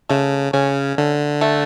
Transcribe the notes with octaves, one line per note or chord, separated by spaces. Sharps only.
C#3 A3
C#3 C#4
D3 A3
A3